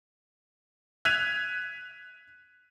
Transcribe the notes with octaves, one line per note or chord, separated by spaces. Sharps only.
F#6 G#6 B6 D#7 F7